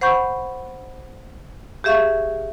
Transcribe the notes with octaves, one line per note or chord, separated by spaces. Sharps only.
C5 F#5 B5 C#6 G6
G4 G#4 E5 F5 C#6